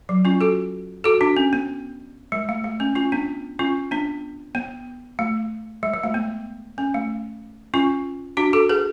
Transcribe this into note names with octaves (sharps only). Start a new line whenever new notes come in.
F#3
C#4 F4
F#4 A4
F#4 A4
D4 F#4
C#4
B3
G#3
A3
A3
C#4
C#4 F4
B3 D4
C#4 F4
B3 D4
B3
A3
G#3
G#3
A3
B3
C#4
A3
C#4 F4
D4 F#4
F#4 A4
G#4 B4